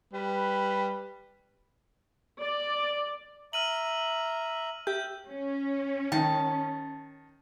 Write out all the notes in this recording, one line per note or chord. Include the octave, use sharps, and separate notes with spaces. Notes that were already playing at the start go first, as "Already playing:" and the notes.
G3 B4
D5
E5 A#5 F6 D#7 F#7
G4 E5 G5 G6
C#4
D#3 A5